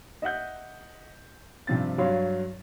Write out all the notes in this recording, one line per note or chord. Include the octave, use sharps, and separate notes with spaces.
D#5 E5 F#5 G6
G2 C3 F3 C4 A6
G2 F#3 C#5 F5 C6